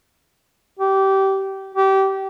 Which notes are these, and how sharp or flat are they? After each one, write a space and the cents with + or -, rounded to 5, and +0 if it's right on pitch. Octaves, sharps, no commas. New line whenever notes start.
G4 -20
G4 -25